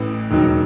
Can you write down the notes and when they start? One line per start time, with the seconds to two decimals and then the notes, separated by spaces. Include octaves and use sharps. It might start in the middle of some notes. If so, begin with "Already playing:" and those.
Already playing: A1 A2 E3
0.30 E1 D#2 D#3 F#3